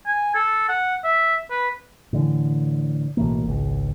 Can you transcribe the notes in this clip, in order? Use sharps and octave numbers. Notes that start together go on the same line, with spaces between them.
G#5
A4
F#5
E5
B4
A2 D3 E3
B1 A2 E3 A#3
G#1 C#2